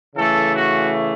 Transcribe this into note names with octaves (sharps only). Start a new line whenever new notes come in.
C#3 E3 A3 A4
F#4